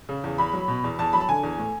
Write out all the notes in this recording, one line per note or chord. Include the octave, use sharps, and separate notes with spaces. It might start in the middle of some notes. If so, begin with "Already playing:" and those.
C#3
E2
E2 B5
F#3
B2
E2
E2 A5
F#3 B5
A5
D3 G#5
E2
A2